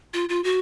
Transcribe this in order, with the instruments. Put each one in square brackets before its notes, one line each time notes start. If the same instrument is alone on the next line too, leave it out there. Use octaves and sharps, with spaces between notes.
[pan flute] F4
F4
F#4